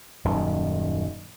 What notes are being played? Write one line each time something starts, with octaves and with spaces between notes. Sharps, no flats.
D#1 F#2 D#3